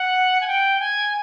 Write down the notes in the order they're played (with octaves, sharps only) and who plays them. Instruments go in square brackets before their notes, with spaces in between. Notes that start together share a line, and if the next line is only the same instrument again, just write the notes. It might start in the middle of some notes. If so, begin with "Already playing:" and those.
Already playing: [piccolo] F#5
G#5
G5
G#5